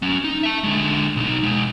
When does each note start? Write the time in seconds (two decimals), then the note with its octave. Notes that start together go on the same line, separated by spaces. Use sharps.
0.02 F#3 C#4
0.24 D#4
0.43 E5 A5
0.64 D3 G#3
1.16 B1 D#4
1.43 B2 G#3